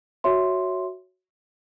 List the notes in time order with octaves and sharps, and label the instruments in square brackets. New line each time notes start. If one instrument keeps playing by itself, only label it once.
[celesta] F#4 C#5 E5 C6